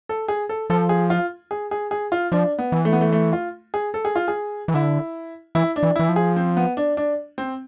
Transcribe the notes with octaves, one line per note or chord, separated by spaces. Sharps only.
A4
G#4
A4
F3 A4
G#4
F4
G#4
G#4
G#4
F4
F3 D4
B3
E3
A3
B3
A3
A3
F4
G#4
A4
G#4
F4
G#4
E3
D3 E4
E3 E4
D4
E3
E3 E4
F3
G#4
C4
B3
D4
D4
C4